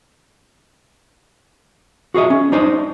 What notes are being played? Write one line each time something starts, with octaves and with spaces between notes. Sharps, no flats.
F#4 G#4 A#4 D#5 E5
C#4
D4 D#4 C5 D#5